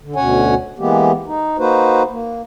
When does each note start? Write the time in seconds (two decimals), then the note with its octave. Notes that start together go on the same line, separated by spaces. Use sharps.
0.01 D3
0.16 D2 B2 C#4 C#5 F#5 G#5
0.79 E3 G#3 A#3 B3 G4
1.26 D#4
1.58 A#3 D#4 F#4 B4 C5
2.11 A#3